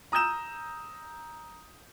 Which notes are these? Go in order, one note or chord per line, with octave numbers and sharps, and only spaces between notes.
A#5 D#6 E6 G6 E7